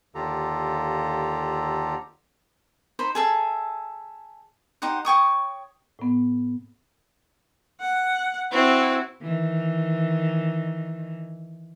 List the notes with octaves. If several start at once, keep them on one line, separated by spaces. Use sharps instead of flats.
D#2 D3 F4 G4 A4 A#5
D#4 C5 B5
G#4 A4 E5
D#4 G4 C5 F#5
C#5 G5 C#6 D#6
A2 B3
F#5
C4 E4 F#4
D#3 E3